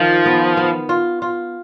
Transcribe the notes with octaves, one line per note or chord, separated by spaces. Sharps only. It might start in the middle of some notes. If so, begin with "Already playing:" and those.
Already playing: D#3 F3 F4
B3
B3
F4
F4